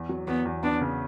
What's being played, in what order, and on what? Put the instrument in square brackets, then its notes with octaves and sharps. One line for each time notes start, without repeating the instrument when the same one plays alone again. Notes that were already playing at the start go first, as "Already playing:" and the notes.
Already playing: [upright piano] E2
F#3
[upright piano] E2 [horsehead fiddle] B3
[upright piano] E2
[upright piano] B3 [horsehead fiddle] D4
[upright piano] C#3